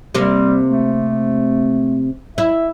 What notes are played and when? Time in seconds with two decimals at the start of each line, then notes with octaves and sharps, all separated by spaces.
0.15 C3 G3 A#3
0.67 A3
2.38 E4 E5